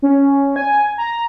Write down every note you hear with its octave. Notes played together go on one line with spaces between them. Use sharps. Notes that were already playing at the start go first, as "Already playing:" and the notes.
C#4
G#5
A#5